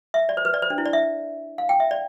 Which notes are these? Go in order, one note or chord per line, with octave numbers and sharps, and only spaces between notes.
E5
D5
C5
B4
D5
C5
D4
E4
D5
E5
F5
G5
E5
D5